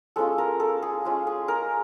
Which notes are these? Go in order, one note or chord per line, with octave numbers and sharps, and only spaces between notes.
G#3 C#4 F4 A4
A#4
A4
G#4
G#3 C#4 F4
G#4
A#4